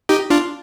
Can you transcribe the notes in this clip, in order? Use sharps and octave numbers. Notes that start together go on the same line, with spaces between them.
D#4 G4
D4 F4